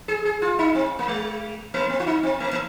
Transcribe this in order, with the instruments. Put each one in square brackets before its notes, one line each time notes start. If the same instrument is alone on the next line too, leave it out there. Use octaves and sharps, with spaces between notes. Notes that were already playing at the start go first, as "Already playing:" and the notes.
[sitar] G#4
G#4
F4
D#4
C4
A#3
G#3
A#3
C4
F4
D#4
C4
A#3
A#3